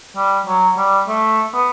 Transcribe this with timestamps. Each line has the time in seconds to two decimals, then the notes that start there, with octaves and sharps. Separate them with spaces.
0.16 G3
0.46 F#3
0.78 G3
1.08 A3
1.54 B3